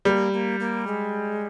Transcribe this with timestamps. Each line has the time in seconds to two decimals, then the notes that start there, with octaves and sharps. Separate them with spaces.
0.05 G3 A#3
0.33 A#3
0.60 A#3
0.87 G#3